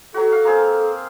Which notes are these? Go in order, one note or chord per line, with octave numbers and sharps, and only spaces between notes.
F#3 F#4 A4
F5
A#3 C4 G#4